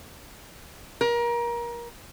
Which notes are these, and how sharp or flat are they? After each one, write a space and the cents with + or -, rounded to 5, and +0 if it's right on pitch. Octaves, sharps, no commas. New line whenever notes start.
A#4 +25